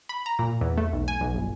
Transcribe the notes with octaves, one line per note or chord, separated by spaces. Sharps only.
B5
A#5
A#2
E2
A3
B1
G#5
B1
G1